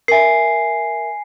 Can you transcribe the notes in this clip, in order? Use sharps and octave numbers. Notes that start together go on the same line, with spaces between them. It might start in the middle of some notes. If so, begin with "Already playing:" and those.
A#4 E5 G#5 C7